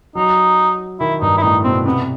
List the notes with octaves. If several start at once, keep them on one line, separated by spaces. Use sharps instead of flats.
F#3 D#4
D#3 E4
G2 D#4
E4
A2 D#4
B2 C4
C3 B3